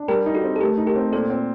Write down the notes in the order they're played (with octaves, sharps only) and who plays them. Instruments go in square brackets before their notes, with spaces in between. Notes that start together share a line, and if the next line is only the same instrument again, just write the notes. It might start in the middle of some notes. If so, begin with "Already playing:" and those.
Already playing: [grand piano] D4
[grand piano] G3 [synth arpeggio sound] G4 A#4
[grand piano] D#4
[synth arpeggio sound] F#4 A4
[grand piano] C4
[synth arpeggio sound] A4
[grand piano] A3 [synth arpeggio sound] G4 A#4
[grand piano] D#4
[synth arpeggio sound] G4 A#4
[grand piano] C4
[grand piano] A#2 [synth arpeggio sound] A4 C5
[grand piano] C4